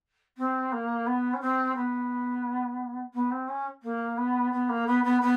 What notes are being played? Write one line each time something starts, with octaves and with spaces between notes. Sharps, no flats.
C4
A#3
B3
C#4
C4
B3
B3
C4
C#4
A#3
B3
B3
A#3
B3
B3
B3